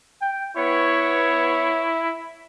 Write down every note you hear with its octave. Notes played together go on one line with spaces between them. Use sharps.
G5
B3 E4 C#5